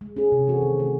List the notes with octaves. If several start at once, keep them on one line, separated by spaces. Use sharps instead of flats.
G#3
C#4 G#4
C3
E3 C4 F#4 A4
D#3
A3 C#4 F#4